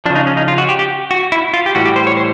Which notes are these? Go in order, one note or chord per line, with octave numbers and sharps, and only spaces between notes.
C#3 F3 D4
D#4
C#4
D#4
F4
F#4
G4
G4
F#4
E4
F4
G4
A2 E3 G3 F#4
G4
C5
C#5
C5